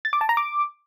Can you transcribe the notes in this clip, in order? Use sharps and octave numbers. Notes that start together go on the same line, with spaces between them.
A6
D6
A5
A#5
D6